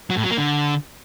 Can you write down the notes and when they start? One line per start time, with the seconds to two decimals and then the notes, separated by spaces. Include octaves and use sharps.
0.10 F#3
0.17 A2
0.24 F#3
0.31 A#3
0.38 D3